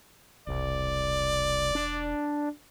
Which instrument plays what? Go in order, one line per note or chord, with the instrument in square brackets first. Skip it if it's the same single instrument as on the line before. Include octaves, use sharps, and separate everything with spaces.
[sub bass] E1 [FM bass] C2 [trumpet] D5
[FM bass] D4